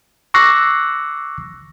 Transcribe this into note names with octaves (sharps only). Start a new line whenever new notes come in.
C#6 D6 E6 F#6 A#6 C7